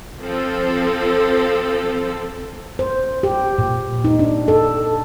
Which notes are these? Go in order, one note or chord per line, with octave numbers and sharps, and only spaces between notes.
F3 C4 A4
C5
G4
A#2
D#4
D4
A4